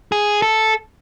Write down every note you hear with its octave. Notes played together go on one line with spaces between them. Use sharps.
G#4
A4